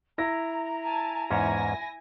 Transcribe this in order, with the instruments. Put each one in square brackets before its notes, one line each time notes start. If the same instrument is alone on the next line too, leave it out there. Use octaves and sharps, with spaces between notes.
[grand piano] E4 A#6 [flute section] A#5
[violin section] G#5 A5
[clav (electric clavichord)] E2 G#2 C#4 [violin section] E4 G#5 A#6